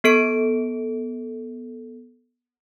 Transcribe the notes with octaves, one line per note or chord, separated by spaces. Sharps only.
B3 A4 D7